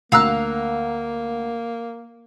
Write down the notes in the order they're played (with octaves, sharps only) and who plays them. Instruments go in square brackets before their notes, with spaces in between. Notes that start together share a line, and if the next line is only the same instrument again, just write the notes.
[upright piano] D2 A#5 [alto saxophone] A#3 [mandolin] F5 E6 F#6